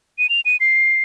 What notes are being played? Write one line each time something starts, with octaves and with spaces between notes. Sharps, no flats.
D#7
F7
D#7
C7